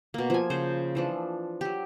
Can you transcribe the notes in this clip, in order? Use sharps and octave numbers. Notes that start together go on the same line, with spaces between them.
B2 A#3
F3 G#5
C#3 C5
E3 F3 D4
F#3 G4